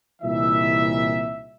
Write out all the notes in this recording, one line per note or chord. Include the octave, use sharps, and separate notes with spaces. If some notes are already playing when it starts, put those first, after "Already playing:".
C2 A#2 E3 D#4 E5